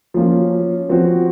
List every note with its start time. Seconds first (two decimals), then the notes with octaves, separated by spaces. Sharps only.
0.14 F3 A#3 C#4 F4
0.89 F3 C4 F#4